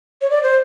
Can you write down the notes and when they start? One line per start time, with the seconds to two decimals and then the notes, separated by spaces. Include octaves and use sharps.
0.22 C#5
0.30 D5
0.43 C5